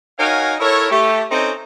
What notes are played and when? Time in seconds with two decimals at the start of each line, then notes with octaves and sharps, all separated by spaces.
0.19 D#4 F#4 A#4 C#5 F5 G#5
0.60 E4 A4 A#4 C#5
0.90 A3 G4
1.30 C4 C#4 D#4 A4 D#5 A#5